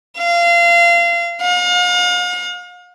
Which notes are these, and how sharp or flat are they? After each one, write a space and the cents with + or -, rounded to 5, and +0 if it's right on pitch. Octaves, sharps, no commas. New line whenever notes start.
F5 -25
F5 +40